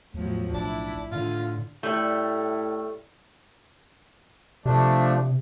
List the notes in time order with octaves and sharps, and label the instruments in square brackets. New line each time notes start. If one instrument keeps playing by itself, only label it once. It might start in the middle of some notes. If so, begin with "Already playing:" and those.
[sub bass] E2 [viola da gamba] A2 F3 F#3
[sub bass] B1 [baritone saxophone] D4 [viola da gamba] E4
[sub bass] A2 [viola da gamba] D3 [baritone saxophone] F4
[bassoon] A2 [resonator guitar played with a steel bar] G3 A3
[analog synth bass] C3 [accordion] F3 A3 D4